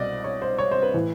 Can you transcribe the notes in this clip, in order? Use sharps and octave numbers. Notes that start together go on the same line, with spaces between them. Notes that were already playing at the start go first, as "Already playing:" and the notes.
Already playing: C2 B2 D5 D#5
C#5
C5
C#5
C5
B4
A2 E3